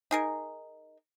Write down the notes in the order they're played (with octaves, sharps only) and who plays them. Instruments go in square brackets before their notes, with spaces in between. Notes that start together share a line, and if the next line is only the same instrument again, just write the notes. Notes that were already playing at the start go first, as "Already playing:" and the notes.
[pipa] D#4 G#4 A#4